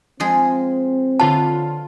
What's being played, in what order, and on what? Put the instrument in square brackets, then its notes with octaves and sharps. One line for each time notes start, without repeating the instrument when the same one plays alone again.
[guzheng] F3 G#3 G#4 [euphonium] C4
[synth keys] D3 F4 C#5 [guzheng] B4 [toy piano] A5